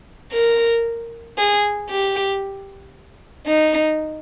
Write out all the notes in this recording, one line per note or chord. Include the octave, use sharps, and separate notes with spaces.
A#4
G#4
G4
D#4